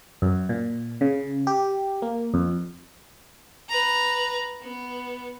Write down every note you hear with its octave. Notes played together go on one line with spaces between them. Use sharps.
F#2
A#2
C#3
G4
A#3
F2
B4 A#5
B3